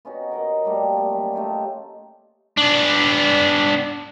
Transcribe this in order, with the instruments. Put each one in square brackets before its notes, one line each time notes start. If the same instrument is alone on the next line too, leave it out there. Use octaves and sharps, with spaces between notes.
[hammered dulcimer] B3 C#4 D#4 F#4
A#4 D#5 F#5
G3 A3 A#3
C4 D5
F#3 C#4
A3 D#4 F4 G4
[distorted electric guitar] B3 D4